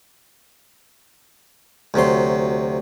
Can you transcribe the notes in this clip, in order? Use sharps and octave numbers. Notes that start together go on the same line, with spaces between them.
D2 C3 F#3 C6